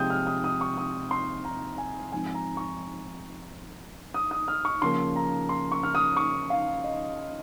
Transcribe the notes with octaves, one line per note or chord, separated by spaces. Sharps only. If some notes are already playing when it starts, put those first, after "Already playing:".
Already playing: C3 F3 G#3 C4 G5 D#6 G6
F6
D#6
D#6
C#6
D#6
C6
A#5
G#5
G#2 F3 C4 G#5
A#5
C#6
D#6
D#6
F6
C#6
C#3 F3 A#3 C6
A#5
C6
C#6
F6
D#6
C#6
F5
D#5